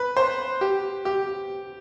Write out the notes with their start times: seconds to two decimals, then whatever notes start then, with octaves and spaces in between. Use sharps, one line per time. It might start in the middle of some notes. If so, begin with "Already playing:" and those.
Already playing: B4
0.17 C5
0.61 G4
1.05 G4